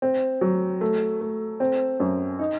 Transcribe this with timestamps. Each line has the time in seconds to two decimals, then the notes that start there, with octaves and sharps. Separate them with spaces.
0.02 C4
0.41 F#3
0.81 A3
1.21 A3
1.60 C4
2.00 F#2
2.39 D#4